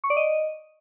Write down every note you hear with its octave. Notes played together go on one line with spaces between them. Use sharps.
C#6
D5
D#5